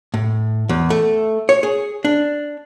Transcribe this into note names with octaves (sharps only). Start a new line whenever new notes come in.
A2
E2
A3
C#5
G#4
D4